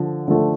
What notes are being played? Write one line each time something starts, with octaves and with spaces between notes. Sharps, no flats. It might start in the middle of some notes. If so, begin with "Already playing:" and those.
Already playing: D3 F3
D3 F3 A3